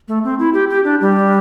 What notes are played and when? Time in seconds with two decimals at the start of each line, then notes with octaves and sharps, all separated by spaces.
0.08 A3
0.24 C4
0.39 E4
0.54 G4
0.70 G4
0.84 D4
1.01 G3